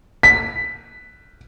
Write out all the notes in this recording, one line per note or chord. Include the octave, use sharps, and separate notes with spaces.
B6